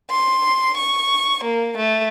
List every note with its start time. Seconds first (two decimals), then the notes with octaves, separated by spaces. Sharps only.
0.10 C6
0.77 C#6
1.44 A#3
1.78 A3